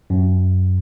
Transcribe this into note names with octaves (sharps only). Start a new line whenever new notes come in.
F#2